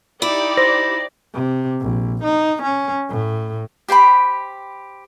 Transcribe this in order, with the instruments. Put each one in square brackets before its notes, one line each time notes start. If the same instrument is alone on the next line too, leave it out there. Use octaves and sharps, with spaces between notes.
[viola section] D#4 G4 D5 [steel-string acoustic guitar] E4
[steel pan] C5 [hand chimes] A#6
[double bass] C3
A#1
D#4
C#4
A2
[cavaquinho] G4 C5 G5 B5